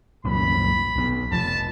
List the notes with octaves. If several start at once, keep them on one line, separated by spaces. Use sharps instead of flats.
C2 F#2 A#2 B5
B1 E3 B3
F1 F3 A5